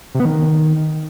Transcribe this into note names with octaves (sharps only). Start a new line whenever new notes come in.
C3
B3
D#3